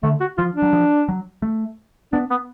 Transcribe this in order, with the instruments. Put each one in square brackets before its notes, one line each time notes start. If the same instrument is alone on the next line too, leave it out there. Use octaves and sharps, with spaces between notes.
[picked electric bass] D3 [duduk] A3
[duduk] F#4
[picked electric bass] F3 [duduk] F4
[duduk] D4
[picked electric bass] F#3
F3
F#3
A3
[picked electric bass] B3 [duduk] D4
[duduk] B3